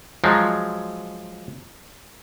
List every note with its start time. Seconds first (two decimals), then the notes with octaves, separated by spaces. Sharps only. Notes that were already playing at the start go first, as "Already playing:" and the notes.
0.24 F3 F#3 G#3